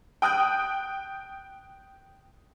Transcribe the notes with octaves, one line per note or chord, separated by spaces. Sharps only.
G5 D#6 F#6 G6